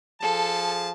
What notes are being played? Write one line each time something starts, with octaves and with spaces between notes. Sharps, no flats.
F3 G#4 A4 A5